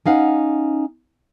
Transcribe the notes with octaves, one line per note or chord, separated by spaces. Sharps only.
C#4 D#4 F5 F#5